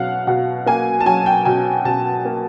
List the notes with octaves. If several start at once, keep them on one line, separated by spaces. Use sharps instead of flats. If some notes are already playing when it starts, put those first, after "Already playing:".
Already playing: B2 F#3 F5 F#5
B2 F#5
A#3 G#5
A5
F#3 G#5
G5
B2 G#5
B2 A5
A#3